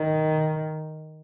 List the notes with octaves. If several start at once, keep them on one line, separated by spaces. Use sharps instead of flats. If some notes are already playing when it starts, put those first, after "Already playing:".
Already playing: D#3